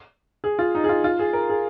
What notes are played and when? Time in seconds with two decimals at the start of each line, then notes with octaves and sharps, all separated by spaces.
0.44 G#4
0.59 F4
0.75 D#4
0.84 G#4
0.89 F4
1.04 F4
1.19 G#4
1.33 A#4
1.49 G#4